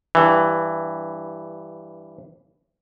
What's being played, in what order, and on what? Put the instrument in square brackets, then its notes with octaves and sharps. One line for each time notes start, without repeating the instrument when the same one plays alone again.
[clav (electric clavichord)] G2 E3